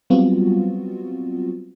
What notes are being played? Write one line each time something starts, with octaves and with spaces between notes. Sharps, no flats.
F#3 G3 B3 C4 F4 F#4